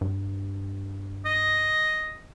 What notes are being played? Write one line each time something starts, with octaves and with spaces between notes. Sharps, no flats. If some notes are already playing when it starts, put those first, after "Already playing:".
G2
D#5